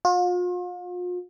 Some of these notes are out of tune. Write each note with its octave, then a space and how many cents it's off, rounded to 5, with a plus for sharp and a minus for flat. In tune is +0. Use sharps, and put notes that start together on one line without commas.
F4 +40